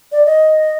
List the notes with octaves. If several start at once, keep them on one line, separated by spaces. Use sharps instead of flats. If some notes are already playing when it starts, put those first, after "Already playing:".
D5
D#5